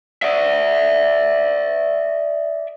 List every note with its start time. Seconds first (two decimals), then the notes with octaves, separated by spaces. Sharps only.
0.23 D5 E5